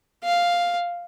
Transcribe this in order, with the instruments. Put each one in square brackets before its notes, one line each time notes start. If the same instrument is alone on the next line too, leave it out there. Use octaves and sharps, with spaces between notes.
[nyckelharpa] F5